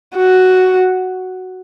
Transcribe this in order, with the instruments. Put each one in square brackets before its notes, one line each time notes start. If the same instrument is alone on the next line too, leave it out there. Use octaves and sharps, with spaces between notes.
[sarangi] F#4